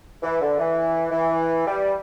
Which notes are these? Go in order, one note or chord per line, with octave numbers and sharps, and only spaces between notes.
E3
D3
E3
E3
G3